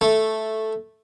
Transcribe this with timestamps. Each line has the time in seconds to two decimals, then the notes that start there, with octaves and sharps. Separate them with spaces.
0.01 A3